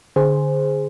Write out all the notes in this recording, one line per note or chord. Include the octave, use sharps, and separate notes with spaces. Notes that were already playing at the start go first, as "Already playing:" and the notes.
D3 G#4 C5